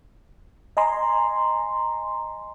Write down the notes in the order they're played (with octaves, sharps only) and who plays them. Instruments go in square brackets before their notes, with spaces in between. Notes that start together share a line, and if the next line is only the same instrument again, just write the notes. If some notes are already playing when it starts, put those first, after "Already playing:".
[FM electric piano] D#5 G#5 A#5 C6